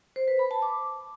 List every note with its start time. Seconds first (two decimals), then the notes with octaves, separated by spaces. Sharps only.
0.16 C5
0.28 B4
0.39 B5
0.51 A5
0.62 D6